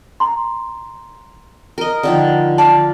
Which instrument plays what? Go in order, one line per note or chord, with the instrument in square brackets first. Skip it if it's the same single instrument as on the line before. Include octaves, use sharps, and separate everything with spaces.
[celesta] A#5 C6
[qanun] A#4 D#5
D3 D#3 F3
[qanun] D5 F5 [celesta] A5